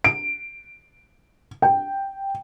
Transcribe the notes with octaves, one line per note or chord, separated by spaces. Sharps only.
D7
G5